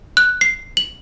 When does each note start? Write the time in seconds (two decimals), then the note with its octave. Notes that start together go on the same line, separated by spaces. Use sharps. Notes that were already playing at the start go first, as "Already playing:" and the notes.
0.17 F#6
0.41 C7
0.77 F#7